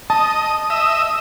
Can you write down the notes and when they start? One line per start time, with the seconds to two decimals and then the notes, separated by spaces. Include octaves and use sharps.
0.10 D#5 A5
0.70 D#5 E5